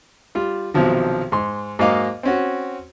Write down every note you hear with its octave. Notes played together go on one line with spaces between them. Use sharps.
G3 F4
B1 C3 D#3 F3 F#3
G#2 C6
G#2 F#3 A#3 D#5 F5 D6
C4 C#4 F#4